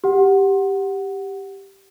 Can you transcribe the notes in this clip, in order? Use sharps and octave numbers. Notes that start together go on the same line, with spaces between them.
G4 F#5